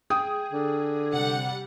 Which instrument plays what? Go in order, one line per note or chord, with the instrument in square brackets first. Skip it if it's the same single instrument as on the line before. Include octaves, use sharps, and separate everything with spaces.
[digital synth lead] G#4 [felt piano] G5 D#6
[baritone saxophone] D3
[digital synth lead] C3 [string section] G3 F#5